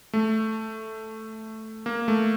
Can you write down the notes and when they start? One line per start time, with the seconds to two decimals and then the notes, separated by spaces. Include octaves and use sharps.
0.13 A3
1.86 A#3
2.08 A3